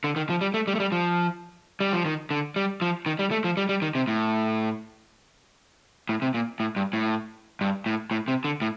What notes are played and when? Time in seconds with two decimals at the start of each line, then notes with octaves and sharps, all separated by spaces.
0.04 D3
0.16 D#3
0.30 F3
0.41 G3
0.54 A3
0.67 G3
0.75 A3
0.80 G3
0.92 F3
1.80 G3
1.93 F3
2.05 D#3
2.31 D3
2.56 G3
2.82 F3
3.06 D#3
3.19 G3
3.31 A3
3.44 F3
3.57 G3
3.69 G3
3.82 D#3
3.95 C3
4.08 A2
6.09 A2
6.22 C3
6.34 A#2
6.60 A2
6.76 G2
6.93 A2
7.61 G2
7.86 A2
8.11 A2
8.28 C3
8.45 D3
8.61 A2